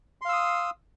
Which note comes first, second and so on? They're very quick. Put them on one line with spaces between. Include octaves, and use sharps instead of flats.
C6 F5 E6 D#6